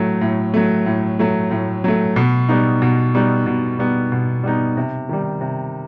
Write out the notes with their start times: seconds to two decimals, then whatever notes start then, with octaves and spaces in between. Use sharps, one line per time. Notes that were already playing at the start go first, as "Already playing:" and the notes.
Already playing: A2 F#3 A3
0.21 A2
0.54 F#3 A3
0.86 A2
1.19 F#3 A3
1.51 A2
1.84 F#3 A3
2.16 B2
2.49 G3 B3 D#4
2.82 B2
3.15 G3 B3 D#4
3.46 B2
3.79 G3 B3 D#4
4.12 B2
4.44 G3 B3 D#4
4.77 C3
5.09 D#3 G3
5.41 C3